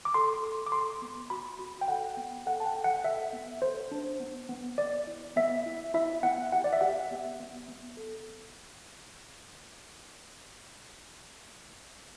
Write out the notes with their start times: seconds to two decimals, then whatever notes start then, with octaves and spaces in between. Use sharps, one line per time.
0.05 D6
0.14 A4 C6
0.43 A4
0.67 D6
0.72 A4 C6
1.02 B3
1.30 F#4 B5
1.59 F#4
1.81 G5
1.88 A4 F#5
2.17 B3
2.46 A4 F#5
2.60 A5
2.65 G5
2.75 A4
2.84 F#5
3.04 A4 E5
3.33 B3
3.62 A4 C5
3.91 D4
4.20 B3
4.49 B3
4.78 B3 D5
5.07 E4
5.36 B3 E5
5.66 E4
5.94 E4 E5
6.23 B3 F#5
6.52 G4 F#5
6.64 D5
6.73 E5
6.81 G4 F#5
7.11 B3
7.40 B3
7.68 B3
7.97 A4